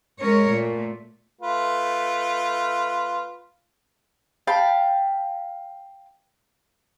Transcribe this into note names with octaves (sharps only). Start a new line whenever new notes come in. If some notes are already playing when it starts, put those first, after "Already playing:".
G#3 C#4 A#4 C#5
A#2 A3
A3 F4 B4
F5 G5 A5 B5